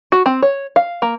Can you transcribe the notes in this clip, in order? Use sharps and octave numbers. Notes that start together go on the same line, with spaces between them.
F#4
C4
C#5
F5
A#3